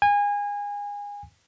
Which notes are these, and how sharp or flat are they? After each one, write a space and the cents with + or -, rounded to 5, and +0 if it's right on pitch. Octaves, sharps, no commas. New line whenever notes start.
G#5 -25